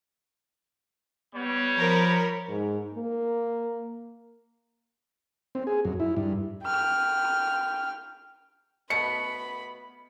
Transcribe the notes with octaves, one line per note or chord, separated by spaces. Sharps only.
G3 B3 C#5
F3 A#4 B5
G#2
A#3
C4
G#4
F#2
E4
G2
G5 F6
B2 A3 B3 B5 C#7